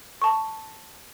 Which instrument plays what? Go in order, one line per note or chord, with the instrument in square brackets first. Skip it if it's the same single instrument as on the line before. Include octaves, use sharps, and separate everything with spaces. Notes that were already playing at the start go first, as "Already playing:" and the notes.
[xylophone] A5 C#6